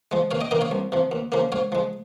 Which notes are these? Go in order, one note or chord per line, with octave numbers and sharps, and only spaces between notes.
F3 G#3
D#2 C#5 F5
D#5 G5
D#3 A#3 D#5 G5
C#5 F5
C2
C3 F3
D#2
C#3 F3 A#3
G#2 C#5 F5
F3 G#3